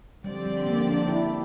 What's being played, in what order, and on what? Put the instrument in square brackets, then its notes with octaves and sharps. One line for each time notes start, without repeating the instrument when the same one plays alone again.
[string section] D3 F3 C4 G4 D5 [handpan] G3
[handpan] G3
A#3
D4
E4